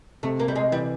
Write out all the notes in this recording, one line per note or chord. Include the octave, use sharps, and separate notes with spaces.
C3 A3
A#3
G3
G#3
E3 G3